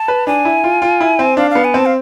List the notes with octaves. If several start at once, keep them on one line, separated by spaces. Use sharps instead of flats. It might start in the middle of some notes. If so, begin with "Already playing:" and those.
Already playing: A5
B4
D4 G#5
E4
F4
F4
E4
C4
D4 F5
B3 F5
G#5
C4 A5
F5